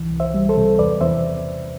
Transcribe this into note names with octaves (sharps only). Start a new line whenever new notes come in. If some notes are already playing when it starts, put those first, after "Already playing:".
Already playing: C2 E3
C2
C5 E5
G3
A4 C5
C3
E2 B4 D5
E2 C5 E5